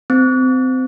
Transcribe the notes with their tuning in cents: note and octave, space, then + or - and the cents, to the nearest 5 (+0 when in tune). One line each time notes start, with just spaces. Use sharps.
C4 -25